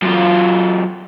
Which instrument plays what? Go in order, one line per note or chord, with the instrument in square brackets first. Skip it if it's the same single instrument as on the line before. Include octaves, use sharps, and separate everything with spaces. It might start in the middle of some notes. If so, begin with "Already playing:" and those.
[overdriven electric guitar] F#2 F4